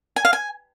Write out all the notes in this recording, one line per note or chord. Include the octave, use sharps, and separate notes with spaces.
G#5
F5
G#5